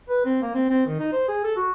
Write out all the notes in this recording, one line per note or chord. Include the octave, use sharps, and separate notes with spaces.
B4
C4
A#3
C4
C4
D#3
D#4
C5
G#4
A4
F#4